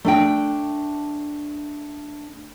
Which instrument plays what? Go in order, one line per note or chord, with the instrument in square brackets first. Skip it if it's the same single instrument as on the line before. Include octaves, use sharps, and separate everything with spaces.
[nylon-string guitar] A3 D4 G5